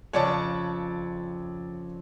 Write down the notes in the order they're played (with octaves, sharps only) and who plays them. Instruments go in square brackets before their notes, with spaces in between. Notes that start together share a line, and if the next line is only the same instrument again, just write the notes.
[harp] F2 C#3 C#6 [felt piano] C#5 D5 A5